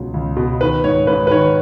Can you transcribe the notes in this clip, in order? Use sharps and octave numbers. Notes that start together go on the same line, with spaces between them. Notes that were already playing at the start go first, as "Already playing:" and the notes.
Already playing: C#2 B2
C#2
B2
D#3 B4
G#2 C#5
G#2 B4
B4
D#3 C#5